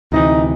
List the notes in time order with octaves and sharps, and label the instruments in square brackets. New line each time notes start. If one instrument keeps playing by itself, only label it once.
[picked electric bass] D2 C3 E3 [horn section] D#4